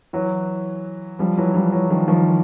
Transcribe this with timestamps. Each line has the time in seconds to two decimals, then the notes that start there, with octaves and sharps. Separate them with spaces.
0.13 E3 F#3
1.19 F3 G3
1.37 E3 F#3
1.55 F3 G3
1.72 E3 F#3
1.90 D#3 F3
2.08 D#3 F3